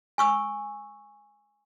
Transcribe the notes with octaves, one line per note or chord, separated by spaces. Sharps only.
G#5 C#6 E6